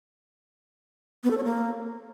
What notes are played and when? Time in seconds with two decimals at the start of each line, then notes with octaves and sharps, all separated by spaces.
1.24 B3
1.31 A4
1.37 C#5
1.44 A#3